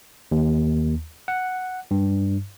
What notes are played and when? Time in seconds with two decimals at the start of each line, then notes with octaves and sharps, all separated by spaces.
0.32 D#2
1.28 F#5
1.91 G2